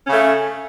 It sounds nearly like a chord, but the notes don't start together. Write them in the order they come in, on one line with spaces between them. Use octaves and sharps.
C#4 C#3 A3